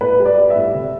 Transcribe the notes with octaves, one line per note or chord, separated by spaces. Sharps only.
A2 B4
G3
D5
G3
E5
A2
C3